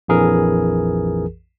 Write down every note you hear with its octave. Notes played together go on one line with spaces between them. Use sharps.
A#1 F2 E3 G#4 A#4